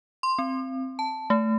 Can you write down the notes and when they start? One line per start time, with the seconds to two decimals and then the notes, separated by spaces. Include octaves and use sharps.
0.23 C6
0.39 C4
0.99 A5
1.30 A3